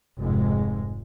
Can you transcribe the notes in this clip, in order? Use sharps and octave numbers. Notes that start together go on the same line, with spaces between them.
F1 G#2 G#3